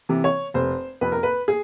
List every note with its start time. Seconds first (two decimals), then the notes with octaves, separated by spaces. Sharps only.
0.09 C3 E3
0.24 C#5
0.54 F1 C5
1.01 F2 C3 B4
1.12 A#4
1.23 B4
1.48 G#4